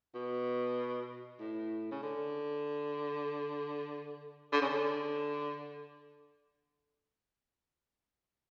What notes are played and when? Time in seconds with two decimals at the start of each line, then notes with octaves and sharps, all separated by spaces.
0.15 B2
1.40 A2
1.91 C#3
2.02 D3
4.52 D3
4.61 C#3
4.69 D3